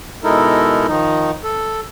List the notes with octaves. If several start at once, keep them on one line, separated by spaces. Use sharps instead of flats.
B2 G#3 D#4 E4 A4 A#4
D#3 F3 D#4
A4